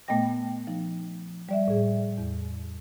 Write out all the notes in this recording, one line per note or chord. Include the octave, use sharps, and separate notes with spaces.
A#2 A3 B3 D#5 G5 A#6
F3 D#4
G3 D5 E5
A2 G#4
E2